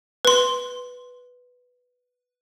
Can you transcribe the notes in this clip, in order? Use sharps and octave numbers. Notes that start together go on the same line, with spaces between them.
B4 C6